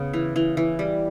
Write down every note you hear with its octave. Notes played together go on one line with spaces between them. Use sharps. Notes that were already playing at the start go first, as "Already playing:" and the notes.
Already playing: C#3 B3
E3
E3
E3
G3